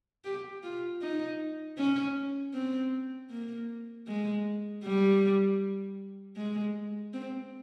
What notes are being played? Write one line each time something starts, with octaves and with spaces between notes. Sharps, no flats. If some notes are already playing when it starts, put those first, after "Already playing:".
G4
F4
D#4
C#4
C4
A#3
G#3
G3
G#3
C4